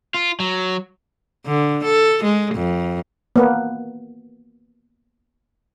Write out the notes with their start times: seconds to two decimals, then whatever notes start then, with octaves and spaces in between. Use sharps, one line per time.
0.14 F4
0.40 F#3
1.46 D3
1.84 A4
2.24 G#3
2.55 F2
3.36 A#3 B3